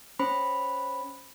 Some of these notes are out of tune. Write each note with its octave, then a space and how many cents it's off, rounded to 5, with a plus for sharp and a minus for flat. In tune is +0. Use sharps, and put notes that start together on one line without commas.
C#4 +0 C5 +0 B5 +0